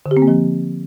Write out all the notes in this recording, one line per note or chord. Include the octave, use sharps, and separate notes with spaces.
D3
G4
C4
A#3
F3